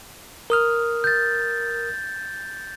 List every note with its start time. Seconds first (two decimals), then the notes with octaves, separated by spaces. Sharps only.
0.50 A#4 D#6 F6
1.04 G6 A6